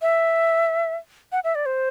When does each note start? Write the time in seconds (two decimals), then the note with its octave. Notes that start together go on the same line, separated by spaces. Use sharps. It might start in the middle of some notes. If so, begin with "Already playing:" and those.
0.02 E5
1.32 F#5
1.44 E5
1.55 D5
1.66 C5